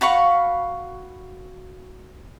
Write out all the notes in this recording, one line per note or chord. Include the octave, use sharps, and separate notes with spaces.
F#4 F5 B5 C#6